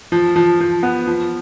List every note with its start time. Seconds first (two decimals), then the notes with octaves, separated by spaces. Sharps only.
0.12 F3
0.36 F3
0.60 F3
0.83 B3
1.07 F3